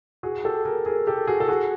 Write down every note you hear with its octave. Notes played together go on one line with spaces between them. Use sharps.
F#4 G#4
G4 A4
G#4 A#4
G#4 A#4
G4 A4
F#4 G#4
A4
F#4 G#4